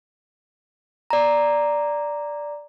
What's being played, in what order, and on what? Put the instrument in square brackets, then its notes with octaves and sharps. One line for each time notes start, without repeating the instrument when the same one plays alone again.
[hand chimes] D5 A#5